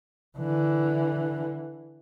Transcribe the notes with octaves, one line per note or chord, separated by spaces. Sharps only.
D3 E3